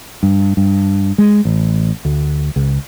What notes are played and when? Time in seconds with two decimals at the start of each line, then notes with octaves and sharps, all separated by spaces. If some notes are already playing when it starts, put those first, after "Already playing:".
0.23 G2
0.57 G2
1.18 G#3
1.45 A1
2.05 D2
2.56 C#2